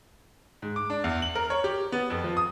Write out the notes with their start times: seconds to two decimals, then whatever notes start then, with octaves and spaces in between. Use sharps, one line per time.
0.62 G#2
0.76 D6
0.90 D4
1.04 E2
1.22 F#7
1.35 A#4
1.50 C#5
1.64 G4
1.92 B3
2.10 F2
2.24 F3
2.37 D#6